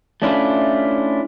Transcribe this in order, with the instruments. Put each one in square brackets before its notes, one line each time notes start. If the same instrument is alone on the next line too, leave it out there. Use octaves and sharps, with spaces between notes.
[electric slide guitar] A3 C#4 D4 E4 F4